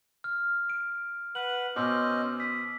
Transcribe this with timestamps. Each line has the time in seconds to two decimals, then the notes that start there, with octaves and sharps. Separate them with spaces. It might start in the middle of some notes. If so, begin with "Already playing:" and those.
0.24 F6
0.70 D7
1.35 B4 F#5 F#7
1.76 B2 C#4 C5 D#5 D6 E6
2.40 D#6 B6